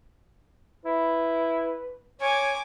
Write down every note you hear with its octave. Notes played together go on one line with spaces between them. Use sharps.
E4 B4
C#5 G#5 D6